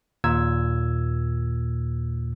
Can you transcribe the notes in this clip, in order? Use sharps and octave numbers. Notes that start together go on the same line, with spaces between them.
D#2 A#2 E6 G#6